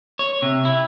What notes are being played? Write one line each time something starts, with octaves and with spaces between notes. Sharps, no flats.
C#5
C3
E4